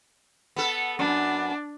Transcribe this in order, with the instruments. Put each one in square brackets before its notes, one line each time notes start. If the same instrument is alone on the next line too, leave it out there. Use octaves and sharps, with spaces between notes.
[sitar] B3 A4
[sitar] F#2 B3 [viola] D4